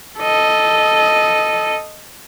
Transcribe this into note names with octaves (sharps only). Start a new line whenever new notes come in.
A4 D#5